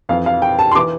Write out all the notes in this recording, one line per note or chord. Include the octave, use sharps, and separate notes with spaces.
F2 E3 F5
F5
G5
A5
C6
E3 D6